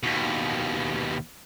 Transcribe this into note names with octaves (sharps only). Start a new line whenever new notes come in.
D#2 B2